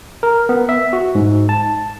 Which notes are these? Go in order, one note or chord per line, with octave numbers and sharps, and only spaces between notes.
A#4
B3
E5
F#4
G#2
A5